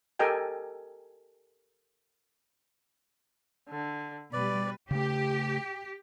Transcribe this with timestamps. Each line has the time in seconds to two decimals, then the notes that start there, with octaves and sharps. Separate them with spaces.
0.19 G4 A4 A#4 D#5 G5 G#5
3.69 D3
4.33 B2 G3 B4 D5
4.91 C#3 A3 G4